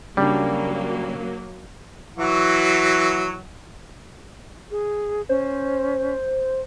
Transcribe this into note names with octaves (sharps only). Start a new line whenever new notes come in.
C#3 F#3 G3 A#3 D4
E3 F#3 F#4
G#4
C#4 C5